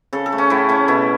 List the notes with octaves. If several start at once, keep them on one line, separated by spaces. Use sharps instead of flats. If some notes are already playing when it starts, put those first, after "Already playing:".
C#3 A4
A4
A3
C#4
A2 E4
A3 C#4
B2 E4